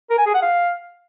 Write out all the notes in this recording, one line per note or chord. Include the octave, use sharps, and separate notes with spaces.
A#4
G#5
G#4
F#5
F5